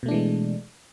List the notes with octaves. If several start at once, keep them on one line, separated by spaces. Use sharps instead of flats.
B2 E3 G#3 A3 D4